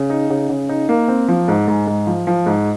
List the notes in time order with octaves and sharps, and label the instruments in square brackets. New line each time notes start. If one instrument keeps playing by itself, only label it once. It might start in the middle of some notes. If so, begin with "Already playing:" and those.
Already playing: [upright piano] C#3
D#4
C#3
C#3
D#4
A#3
C4
F3
G#2
G#2
G#2
F3
F3
G#2